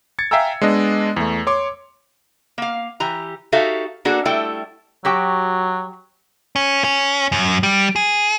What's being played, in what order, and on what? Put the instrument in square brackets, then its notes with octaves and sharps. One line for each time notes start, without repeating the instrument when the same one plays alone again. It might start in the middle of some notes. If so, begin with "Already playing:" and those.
[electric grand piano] G#6 A6 C#7
E5 F5 G5 G#5 A#5 E6
G#3 B3 D4 D#5
E2 A3
C#5 C6 D6
[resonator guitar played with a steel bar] A#3 F5
E3 G4 A#5
D#4 F#4 G4 A4 E5 F5
A#3 D4 F#4 G#4 A4
G3 A3 E4 A4 G5
[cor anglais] F#3 [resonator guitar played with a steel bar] F#4 G4 G5
[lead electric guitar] C#4
C#4
F#2
G3
G#4